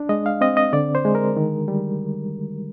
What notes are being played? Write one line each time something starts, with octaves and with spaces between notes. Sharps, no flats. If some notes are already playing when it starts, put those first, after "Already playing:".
Already playing: D4
G#3 D#5
F5
C4 D#5
D#5
D3 D5
C5
G#3
A#4
D#3
G3